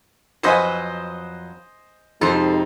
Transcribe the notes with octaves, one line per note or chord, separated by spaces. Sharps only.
F2 F#3 B4 C5 D#5 G#5
F2 C3 G#3 D#4 A4 C5